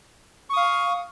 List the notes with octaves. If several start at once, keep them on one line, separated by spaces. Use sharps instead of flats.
F5 C#6 D#6